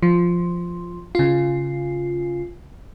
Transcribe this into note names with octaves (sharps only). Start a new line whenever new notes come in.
F3
C#3 F4